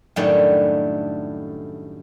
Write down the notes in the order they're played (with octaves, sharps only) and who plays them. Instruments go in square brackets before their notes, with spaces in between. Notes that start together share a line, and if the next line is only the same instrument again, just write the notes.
[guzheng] F#2 A2 D#3 G3 A3 D4